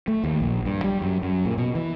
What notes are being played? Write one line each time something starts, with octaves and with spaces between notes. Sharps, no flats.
A3
D#2
A#1
G2
G3
F#2
F#2
A#2
B2
E3